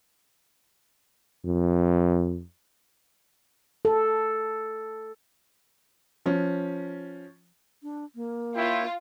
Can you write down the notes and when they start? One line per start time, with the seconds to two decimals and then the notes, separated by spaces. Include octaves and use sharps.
1.45 F2
3.85 A4
6.26 F3 C#4
7.83 D4
8.15 A#3
8.56 E4 F4 C#5 G5